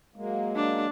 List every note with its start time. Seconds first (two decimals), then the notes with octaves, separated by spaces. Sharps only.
0.16 F#3 G#3 A#3
0.56 D4